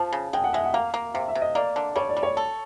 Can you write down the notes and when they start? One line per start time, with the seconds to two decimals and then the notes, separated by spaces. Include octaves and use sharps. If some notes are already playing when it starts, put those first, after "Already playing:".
Already playing: F3 A5
0.13 C#3
0.33 G#3 G5
0.44 F#5
0.53 G#3 E5
0.64 F#5
0.74 A#3 F5
0.94 A#3
1.14 C3 F5
1.28 E5
1.35 C3
1.41 D#5
1.55 A#3 D5
1.76 D3
1.96 G3 C#5
2.09 D5
2.17 G3
2.23 C#5
2.37 A4